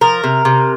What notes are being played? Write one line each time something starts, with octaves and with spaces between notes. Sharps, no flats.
F3 A#4
C3
C3